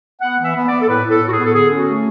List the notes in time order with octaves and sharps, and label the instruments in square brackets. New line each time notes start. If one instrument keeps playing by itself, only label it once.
[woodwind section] B3 F#5
E3 E5
B3
D5
B3
A4
A2 B4
A2
A4
A2
F#4
G#4
B3
A4
D3 G#4
C#4
F#4
A3